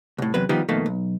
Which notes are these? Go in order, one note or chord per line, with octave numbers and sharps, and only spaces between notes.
C2 A2
E2 C3 F#3 B4
D#3 F3 G3 B3 D#4 G4
F2 B2 D#3 A3 A#3
B1